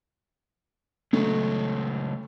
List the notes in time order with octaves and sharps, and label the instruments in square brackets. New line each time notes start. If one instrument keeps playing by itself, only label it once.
[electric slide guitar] C#3 F#3 G#3 [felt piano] A3